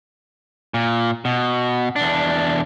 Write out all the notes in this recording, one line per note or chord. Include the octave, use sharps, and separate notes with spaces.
A#2
B2
E2 D4